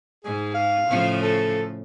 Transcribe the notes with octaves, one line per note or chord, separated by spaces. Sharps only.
G#2 G#4
F5
A2 C#3 F3
A4